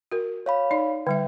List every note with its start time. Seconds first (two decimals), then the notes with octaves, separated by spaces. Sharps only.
0.12 F#4 A#4
0.46 C#5 F5 B5
0.71 D#4 D5
1.07 D3 G3 E5 G5